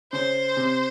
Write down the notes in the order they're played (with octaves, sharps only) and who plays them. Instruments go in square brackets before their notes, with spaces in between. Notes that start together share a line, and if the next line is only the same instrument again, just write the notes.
[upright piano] C#3 [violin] C5
[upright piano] C3